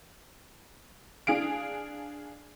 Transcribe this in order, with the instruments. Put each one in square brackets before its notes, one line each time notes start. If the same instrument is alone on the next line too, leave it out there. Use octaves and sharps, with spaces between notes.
[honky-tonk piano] D4 G#4 F5 D7